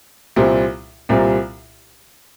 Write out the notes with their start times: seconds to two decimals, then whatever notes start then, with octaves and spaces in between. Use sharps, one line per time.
0.36 C2 A#2 G3 C4
1.09 C2 A#2 G3 C4